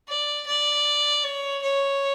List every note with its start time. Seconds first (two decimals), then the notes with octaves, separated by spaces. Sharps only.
0.08 D5
0.47 D5
1.24 C#5
1.62 C#5